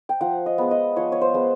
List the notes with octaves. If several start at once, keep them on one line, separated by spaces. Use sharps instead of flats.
G5
F3 F#5
D#5
G#3 B3
D#5
F3 C#5
C#5
C5
G#3 B3